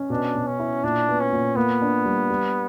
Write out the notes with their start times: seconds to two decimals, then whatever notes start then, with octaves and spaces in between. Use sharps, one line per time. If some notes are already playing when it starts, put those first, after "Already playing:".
Already playing: C#4
0.10 B2 D4
0.35 B2
0.47 C#4
0.60 E4
0.84 A#2 D4
1.08 B3
1.20 C#4
1.32 A#2
1.56 A#3 B3
1.81 D4
2.05 G3
2.30 G3